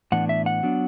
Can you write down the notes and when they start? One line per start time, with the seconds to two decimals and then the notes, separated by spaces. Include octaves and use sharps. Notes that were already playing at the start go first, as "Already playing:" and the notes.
0.12 A2 E3 B3 D4 F#5
0.29 E5
0.46 F#5
0.63 F#3 B3 D4